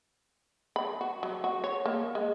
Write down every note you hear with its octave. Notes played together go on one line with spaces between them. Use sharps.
B5
F#4
F#3
F#4
C#5
A#3
G#3